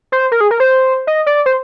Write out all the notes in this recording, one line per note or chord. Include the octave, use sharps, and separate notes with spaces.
C5
A#4
G#4
A#4
C5
D#5
D5
C5